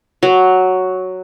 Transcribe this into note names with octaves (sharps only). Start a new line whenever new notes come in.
F#3